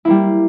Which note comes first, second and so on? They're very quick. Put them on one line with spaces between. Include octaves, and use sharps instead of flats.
E4 A#3 G3